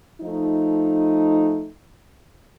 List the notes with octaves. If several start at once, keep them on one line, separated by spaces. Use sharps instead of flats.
F3 A3 D#4